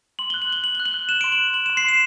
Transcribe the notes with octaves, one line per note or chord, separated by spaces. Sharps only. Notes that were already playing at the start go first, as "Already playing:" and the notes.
C6 F#7
F#6 G7
F#7
F#6 G7
F#6 F#7
F#6 G7
F#7
F#6
F#6 E7
C6 D7
F#7
C6
F#6 F#7
C6 E7
C7
C6 E7